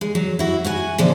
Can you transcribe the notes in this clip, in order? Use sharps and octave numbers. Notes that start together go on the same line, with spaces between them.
G#3
F#3
E4 F#4
F#4 F#5 G#5
A#2 D3 F3 A3 C#4 A4